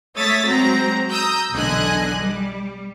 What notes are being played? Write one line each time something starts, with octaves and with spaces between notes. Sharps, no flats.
A3 C#5 E5 D#6 A6 B6
F#3 G#3 C4 A#5
A#5 D#6 E6 G6
B1 E2 D3 D#5 G#5 F#6
G3